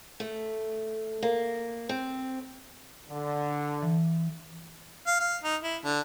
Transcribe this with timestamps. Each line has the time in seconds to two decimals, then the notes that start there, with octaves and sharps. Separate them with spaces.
0.20 A3
1.23 A#3
1.89 C4
3.09 D3
3.83 E3
5.07 F5
5.20 F5
5.44 D#4
5.64 E4
5.85 D3